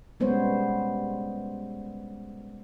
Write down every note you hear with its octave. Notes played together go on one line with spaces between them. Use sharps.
G3 G#3 B3 C#4 C5 C#5